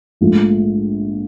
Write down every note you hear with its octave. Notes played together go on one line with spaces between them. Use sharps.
A#1 G#2 F3 A3